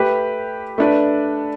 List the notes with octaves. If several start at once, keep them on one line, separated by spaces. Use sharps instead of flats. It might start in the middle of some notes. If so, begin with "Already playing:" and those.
Already playing: A3 G4 B4
A3 D4 B4